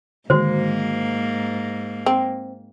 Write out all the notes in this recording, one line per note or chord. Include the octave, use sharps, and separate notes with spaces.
G#2 D3 D#3 G#3 A#3 F#4 C5
C4